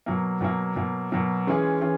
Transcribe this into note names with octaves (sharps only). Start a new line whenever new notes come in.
B2 F#3 A#3
B2 F#3 A#3
B2 F#3 A#3
B2 F#3 A#3
E3 G#3 C#4 F4 G#4
E3 C#4 F4 G#4